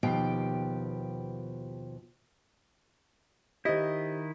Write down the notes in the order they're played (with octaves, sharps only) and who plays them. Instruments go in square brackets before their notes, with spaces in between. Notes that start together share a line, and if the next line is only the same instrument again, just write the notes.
[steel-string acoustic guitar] D#2 B2 F3 G4 G5
[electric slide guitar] D#3 E4 [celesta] G4 C5 [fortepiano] D#5